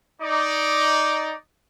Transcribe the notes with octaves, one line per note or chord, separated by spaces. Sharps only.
D#4 D5